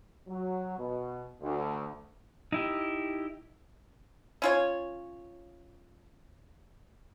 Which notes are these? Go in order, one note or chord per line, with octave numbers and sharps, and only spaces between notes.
F#3
B2
D2
D#4 E4 G4
C#4 F4 C#5